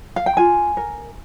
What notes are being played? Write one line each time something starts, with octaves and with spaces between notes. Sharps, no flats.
F5
G5
F4 G#5
A#4